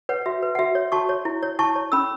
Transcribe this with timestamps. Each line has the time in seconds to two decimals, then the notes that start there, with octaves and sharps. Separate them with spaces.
0.09 B4 C#5 F#5
0.26 F#4 E5
0.42 B4
0.55 F#5
0.59 F#4 E5
0.75 C#5
0.92 F#4 A5 C#6
1.09 C#5
1.25 E4
1.43 C#5
1.59 E4 A5 C#6
1.76 C#5
1.92 C#4 B5 E6